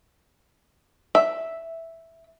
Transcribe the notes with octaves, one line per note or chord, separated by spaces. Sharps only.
E5